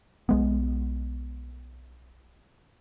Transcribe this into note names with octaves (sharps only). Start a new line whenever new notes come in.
B1 G#3 B3